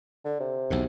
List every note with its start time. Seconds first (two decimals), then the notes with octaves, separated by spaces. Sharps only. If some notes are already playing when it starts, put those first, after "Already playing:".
0.25 D3
0.40 C3
0.70 B1 E2 A2